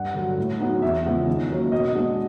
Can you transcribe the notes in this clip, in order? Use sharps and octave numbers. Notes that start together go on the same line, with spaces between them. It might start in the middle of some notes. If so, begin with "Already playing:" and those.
Already playing: G2 F#5
D3 F#3
A2
F#3 B3 D#4
E2 E5
C#3 F3 G#3 B3
D#3
F#3 A#3 C#4
B2 D#5
G#3 B3 D4